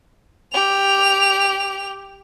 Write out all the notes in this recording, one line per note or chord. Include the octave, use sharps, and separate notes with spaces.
G4 F7